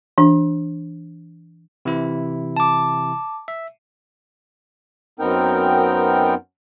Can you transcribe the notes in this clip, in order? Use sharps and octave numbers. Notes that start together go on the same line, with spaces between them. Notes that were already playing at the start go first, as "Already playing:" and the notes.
E3 D4
C3 E3 E4
A5 D6
E5
F#2 B3 C4 D#4 A#4 G5